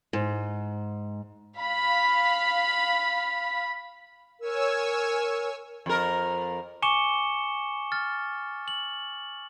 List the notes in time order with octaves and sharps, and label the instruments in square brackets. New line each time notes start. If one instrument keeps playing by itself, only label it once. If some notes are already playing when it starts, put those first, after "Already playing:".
[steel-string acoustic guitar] G#2
[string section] F5 B5
[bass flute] A#4 [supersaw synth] C#5 G#5 E6
[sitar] F2 A#4
[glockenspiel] G#5 C#6 D6 C#7 E7 G7
F6 A6
F#7